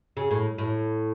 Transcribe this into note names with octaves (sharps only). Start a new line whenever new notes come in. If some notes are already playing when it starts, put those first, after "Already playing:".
C#3
A2
A2